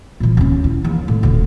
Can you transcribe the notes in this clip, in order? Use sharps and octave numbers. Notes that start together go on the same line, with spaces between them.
A#2 E3
D#2 C#4
E4
D#2 E3
A2
D#1 D2